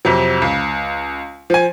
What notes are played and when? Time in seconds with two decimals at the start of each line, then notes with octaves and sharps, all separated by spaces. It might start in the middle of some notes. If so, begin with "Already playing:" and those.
0.05 F2 C3 F#3
0.42 C#2
1.50 F3 G#5